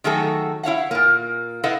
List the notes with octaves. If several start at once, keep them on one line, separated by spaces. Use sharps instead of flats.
D#3 F#3 A3 F#4 G#4 A4
E4 C#5 F5 F#5
A#2 A#3
E4 A4 B4 D#5 F5 F#5